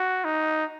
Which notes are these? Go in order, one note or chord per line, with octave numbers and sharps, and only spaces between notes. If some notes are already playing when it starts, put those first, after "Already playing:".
Already playing: F#4
D#4